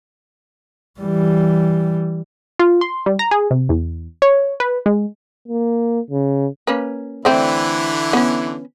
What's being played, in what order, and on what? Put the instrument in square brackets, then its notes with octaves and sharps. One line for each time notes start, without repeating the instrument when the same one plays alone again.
[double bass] E3 G3
[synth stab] F4
C6
G3
A#5
G#4
C3
E2
C#5
B4
G#3
[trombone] A#3
C#3
[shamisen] A#3 C#4 B4
[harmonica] D3 E3 E4 [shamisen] A3 C4 D5
[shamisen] B3 C#4